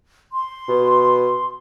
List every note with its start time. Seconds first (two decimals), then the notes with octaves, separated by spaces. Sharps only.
0.33 C6
0.69 B2